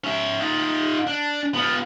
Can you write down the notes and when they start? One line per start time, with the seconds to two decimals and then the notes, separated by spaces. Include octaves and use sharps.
0.04 C#4 E5
0.41 D#4 F4
1.07 D4
1.55 B3 F4